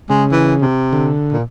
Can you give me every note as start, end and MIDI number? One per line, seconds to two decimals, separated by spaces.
0.10 0.66 49
0.10 0.25 56
0.31 0.55 52
0.61 1.15 48
0.93 1.37 50
1.32 1.43 46